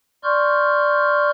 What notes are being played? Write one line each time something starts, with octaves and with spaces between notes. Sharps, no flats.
D5 C6 C#6 F6 G6